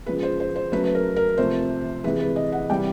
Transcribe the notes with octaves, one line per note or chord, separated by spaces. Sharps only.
C#3 F3 G#3 B4
C5
C5
C5
C#3 F#3 A3 B4
B4
A#4
A#4
C3 F3 A3 C5
C3 E3 G#3 B4
B4
D#5
F#5
C3 E3 G3 G5